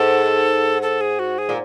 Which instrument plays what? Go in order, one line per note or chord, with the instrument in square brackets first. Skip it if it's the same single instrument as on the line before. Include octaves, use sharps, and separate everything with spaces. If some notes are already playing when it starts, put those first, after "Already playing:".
Already playing: [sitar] G#2 [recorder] A4
[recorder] A4
G#4
F#4
G#4
[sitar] A#2